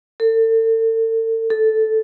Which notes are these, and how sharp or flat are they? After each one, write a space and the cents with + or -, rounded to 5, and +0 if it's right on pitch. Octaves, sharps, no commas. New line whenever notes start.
A4 +40
A4 -5